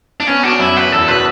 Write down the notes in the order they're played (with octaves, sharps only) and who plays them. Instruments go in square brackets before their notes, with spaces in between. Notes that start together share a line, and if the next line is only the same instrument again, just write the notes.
[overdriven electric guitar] D4
[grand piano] B3 [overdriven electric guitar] C#4
[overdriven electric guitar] D4 [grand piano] F#4
[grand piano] F#2 [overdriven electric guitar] E4
[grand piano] F#4 [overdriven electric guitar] B4
[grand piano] E2 [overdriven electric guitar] A4
[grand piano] B2 [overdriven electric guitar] B4